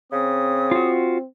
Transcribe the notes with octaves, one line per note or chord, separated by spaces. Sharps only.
C#3 C4 D#6
F4 F#4